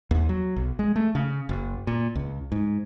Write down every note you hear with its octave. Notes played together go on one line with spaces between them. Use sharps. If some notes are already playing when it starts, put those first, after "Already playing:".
D#2
F#3
B1
G#3
A3
C#3
F#1
A#2
C#2
G#2